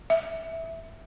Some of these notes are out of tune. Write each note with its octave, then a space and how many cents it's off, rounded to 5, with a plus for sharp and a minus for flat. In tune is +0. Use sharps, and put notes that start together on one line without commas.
E5 -5